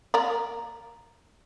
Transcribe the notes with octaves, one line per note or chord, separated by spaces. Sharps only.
A#3 A#4 D5